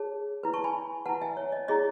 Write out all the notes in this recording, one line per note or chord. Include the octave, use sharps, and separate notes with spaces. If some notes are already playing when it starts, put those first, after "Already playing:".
Already playing: G#4 C#5 A5
E4 B4
A5 C#6
G#5 B5
E4 B4 F#5 A5
E5 G#5
C#5
D#5
E4 G#4 C#5 D#5